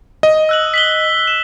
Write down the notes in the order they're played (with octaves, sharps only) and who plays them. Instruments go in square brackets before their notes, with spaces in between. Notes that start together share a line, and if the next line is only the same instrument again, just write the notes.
[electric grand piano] D#5
[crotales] E6 F#6 F#7
B6 F#7 G7
E7